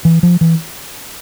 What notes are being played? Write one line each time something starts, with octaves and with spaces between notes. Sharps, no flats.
E3
F3
E3